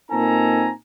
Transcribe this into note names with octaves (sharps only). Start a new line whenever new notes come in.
A#2 C4 D#4 A4 G#5 A#5